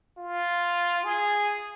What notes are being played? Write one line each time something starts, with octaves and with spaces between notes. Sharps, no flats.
F4
G#4